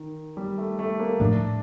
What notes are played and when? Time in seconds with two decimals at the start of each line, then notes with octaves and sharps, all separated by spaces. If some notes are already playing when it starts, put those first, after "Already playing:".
Already playing: D#3
0.37 G3
0.58 A3
0.79 A3
1.00 A#3
1.20 A2 F3 A3 D4